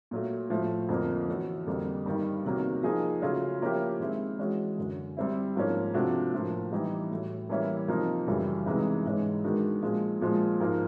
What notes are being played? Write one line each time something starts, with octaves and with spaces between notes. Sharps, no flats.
A#2 F#3 A3
A2 F3 A3
F2 D3 F3 A#3
E3 A3 C#4 F#4 A4
F2 D3 G3 A#3
G2 D#3 G3
E2 C3 D#3 F#3 A#3
F3 A#3 D#4 G#4
C#3 F#3 A3 C#4 F4
F3 A#3 C#4 E4 G4
D#3 G#3 C4 E4
E3 G#3 C#4 F#4
F#2 D3 F#3
G3 C4 E4
G#2 F3 A#3 C#4
C3 F3 A3 D4 F#4
A2 F3 A#3
E3 G3 B3 D#4 G4
A2 F#3 A3
E3 G3 A#3 C#4 E4
C3 F3 A#3 D#4
F#2 C#3 E3 G3
C3 E3 G#3 B3 D#4
G#2 E3 G#3 C#4
D#3 G#3 B3 D4 F#4
A#2 F3 G#3
A#2 F3 G#3
G#2 F3 A#3